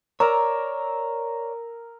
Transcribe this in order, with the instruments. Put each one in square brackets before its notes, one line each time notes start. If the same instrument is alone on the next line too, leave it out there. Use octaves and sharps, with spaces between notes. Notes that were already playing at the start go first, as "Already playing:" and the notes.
[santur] A#4 A#5 E6 [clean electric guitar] C#5 D5